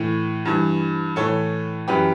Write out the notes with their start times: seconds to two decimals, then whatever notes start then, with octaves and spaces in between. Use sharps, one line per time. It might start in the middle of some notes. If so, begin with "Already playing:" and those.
Already playing: A2 E3
0.45 G2 E3
1.16 A2 E3 A4 C#5
1.88 F#2 E3 G4 B4